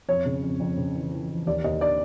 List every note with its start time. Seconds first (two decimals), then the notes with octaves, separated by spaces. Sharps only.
0.08 F2 C#5
0.26 C#3
0.42 F2
0.60 F2
0.77 C#3
0.94 E3
1.12 E3
1.30 E3
1.47 D#2 D5
1.64 D#2 D#5
1.81 D3 D5